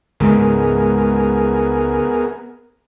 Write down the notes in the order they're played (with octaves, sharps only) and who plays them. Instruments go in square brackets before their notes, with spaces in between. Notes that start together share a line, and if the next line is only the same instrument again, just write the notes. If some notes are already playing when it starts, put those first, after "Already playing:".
[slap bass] C#2 G#2 G#3 [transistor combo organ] B3 G#4 A#4